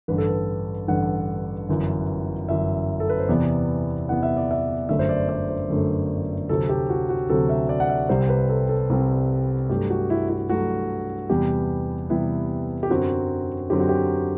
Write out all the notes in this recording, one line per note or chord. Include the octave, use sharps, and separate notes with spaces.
A1 G2 D3 B4
A4
B4
A1 G2 D3 F#5
G1 F#2 E3
G1 F#2 E3 E5
A4
B4
C5
E2 C3 E3 B3 D5
E2 C3 E3 B3 F#5
E5
D5
E5
G1 F#2 D3 A3 E5
C5
D5
D5
C5
G1 F#2 D3 A3
D2 C3 F#3 C4 A4
G4
F#4
F#4
D2 C3 F#3 C4 A4
E5
D5
F#5
E5
C2 C3 G3 C4 C5
B4
A4
A4
C2 C3 G3 C4
G2 F#3 A3 G4
F#4
E4
E4
G2 F#3 A3 F#4
E2 C3 G3 B3 G4
E2 C3 G3 B3 E4
G4
F#2 D3 F#3 C4 F#4
F#2 D3 F#3 C4 G4
F#4
G4